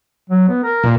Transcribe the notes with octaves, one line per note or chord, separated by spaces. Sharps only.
F#3
B3
A#4
A#2